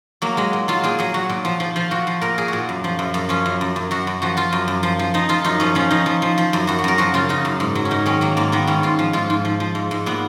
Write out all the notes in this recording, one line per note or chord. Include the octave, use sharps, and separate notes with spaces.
F#3 A#3
F#3 G#3
A#2
F#3 F4
A#2 G#4
F#3 G#4
F#3 F#4
A#2
F3
F3
F3 F4
A#2 F#4
F3
A#2 A#4
A#2 G#4
A#2 F#4
F#2
F3
F#2
F#2
F3 C#4
F#2
F#2
F#2
F#2 F#4
F#2
F3 F#4
F3 F4
F#2
F#2
F3
F3
F3 D#4
F3 F4
F#2 D#4
F3 C#4
F3 C#4
F3 D#4
F3
F3
F3
F#2
F#2 F#4
F#4
F#2 A#4
F3 F#4
C#3 F4
C#3 D#4
F#2
G#2
F#3
C#4
G#2 D#4
D#3 C#4
F#3 A#3
G#2 A#3
D#3 B3
G#2 C#4
G#2 F4
F3
G#2 F4
G#2
F3
F3
G#2
G#2
A#2 B3